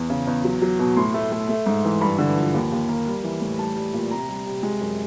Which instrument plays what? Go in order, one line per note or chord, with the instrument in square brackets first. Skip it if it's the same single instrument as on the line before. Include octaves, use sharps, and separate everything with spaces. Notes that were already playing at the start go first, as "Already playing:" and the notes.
Already playing: [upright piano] E2
C#3
E2
F#3
F#3
B2
A2 C6
A3
A3
A3
G#2
E3
G2 B5
D3
F3
D#2
D#2
A#3
G3
E3
A2
G3 A5
G3
A#2
C3 A#5
G3
C3
G#3
F#2